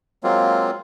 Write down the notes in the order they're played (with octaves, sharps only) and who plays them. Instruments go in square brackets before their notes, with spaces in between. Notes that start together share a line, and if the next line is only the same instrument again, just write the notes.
[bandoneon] F#3 G#3 A#3 C4 F4